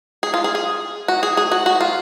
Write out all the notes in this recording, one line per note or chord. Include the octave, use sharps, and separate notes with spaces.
G#4
F4
G#4
G#4
F#4
G#4
G#4
F#4
F#4
F4